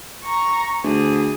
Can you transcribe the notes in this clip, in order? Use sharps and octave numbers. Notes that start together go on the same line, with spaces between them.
A#5 C#6
D2 G#4